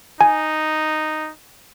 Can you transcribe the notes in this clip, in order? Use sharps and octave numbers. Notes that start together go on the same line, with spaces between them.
D#4 G#5